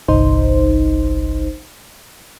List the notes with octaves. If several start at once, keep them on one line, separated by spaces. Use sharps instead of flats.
G1 C2 D#4 C5